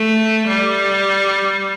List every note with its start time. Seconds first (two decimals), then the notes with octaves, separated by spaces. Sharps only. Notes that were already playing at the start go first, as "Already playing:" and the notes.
Already playing: A3
0.48 G3